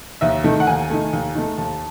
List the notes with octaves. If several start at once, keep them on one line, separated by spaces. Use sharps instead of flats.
D#2 E5
D#3 A3
F#5
D#2 G#5
D#3 A3
D#2
D#3 A3
D#2 A5